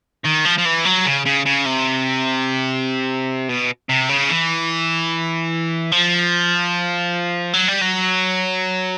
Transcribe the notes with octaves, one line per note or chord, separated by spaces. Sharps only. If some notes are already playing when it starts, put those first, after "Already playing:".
D#3
F3
F3
E3
F#3
C#3
C#3
C#3
C3
B2
C3
C#3
E3
F3
F#3
G3
F#3